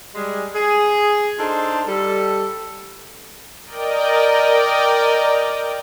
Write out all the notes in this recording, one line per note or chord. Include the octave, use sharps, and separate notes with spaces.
G3 G#3
G#4
D4 D#4 F4 A4 C5
G3 A4
A#4 D5 D#5 G5